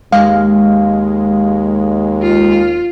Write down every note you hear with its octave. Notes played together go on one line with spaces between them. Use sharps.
D#2 G#3 F5
F4